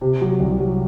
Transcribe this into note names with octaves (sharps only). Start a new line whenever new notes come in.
C3
F#3
C2
F#3